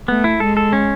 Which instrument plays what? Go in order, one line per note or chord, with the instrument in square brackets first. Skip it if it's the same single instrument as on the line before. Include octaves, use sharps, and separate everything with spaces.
[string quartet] A3 [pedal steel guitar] B3
[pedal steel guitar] E4
[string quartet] G#3 [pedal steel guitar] A4
[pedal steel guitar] A4
C#4